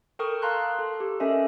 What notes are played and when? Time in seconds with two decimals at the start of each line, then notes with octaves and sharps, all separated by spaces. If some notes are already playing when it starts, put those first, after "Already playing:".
0.19 A4 A#4 G5 C#6 D#6 F6
0.42 F5 A5 A#5 C6 F#6
0.79 A4
1.00 G4
1.20 C#4 A4 A#4 D#5 E5 G#5